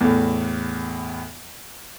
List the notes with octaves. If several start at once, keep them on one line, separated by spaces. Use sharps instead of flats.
E2 A2